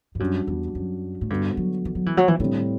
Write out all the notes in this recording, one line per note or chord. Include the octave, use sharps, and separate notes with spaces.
G2
F#2 G3 D4 F#4
E2
F#2
A2
G2 D3 G3 B3 F#4
F#3
E3
F#3
E3
F#3
E3
A2 D3 G3 C4